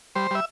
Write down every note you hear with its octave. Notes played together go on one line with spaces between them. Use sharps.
G3 C5
G3 E5